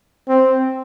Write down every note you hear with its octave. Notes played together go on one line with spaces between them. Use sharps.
C4